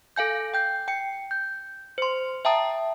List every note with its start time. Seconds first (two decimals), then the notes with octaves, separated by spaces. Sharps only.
0.16 A4 F5 G#5 G6
0.54 G5 G6
0.88 G5 C#7
1.31 G6
1.98 C5 C6
2.45 E5 G5 A5 A#5 D#6